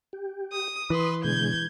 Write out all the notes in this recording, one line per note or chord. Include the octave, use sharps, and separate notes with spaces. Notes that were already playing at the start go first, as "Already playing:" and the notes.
G4
D#6
E3 B4 C6 D#6
B2 D3 G#3 G6 G#6